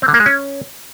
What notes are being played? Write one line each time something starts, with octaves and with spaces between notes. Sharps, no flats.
C4
D3
A#3
G#3
C#4